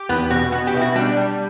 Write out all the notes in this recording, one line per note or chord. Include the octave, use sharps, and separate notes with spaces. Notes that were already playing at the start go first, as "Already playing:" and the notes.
Already playing: G4
E2 B3
B2 F#4
B3 F#4
G4
B2 E4
F#4
G3 D4
G3